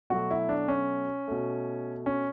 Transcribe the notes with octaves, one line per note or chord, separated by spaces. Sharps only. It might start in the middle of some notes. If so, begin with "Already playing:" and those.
B2 F#3 A3 F#4
E4
D4
C#4
B2 A3
C#4